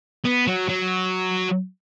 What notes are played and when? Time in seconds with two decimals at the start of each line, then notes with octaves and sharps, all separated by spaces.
0.25 B3
0.47 F#3
0.69 F#3